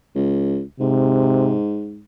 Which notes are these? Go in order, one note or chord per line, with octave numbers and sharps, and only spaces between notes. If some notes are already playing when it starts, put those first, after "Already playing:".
C#2
G#2 C3